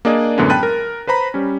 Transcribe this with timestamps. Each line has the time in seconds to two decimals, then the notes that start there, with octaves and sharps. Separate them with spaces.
0.05 A#3 D4 G#4 D5 D#5
0.38 F#2 A2 D3 F#3 G#3 B3
0.50 G5 A5 B5 F#6 A6 D#7
0.63 A#4
1.07 B4 C5 A#5 B5
1.34 G3 C#4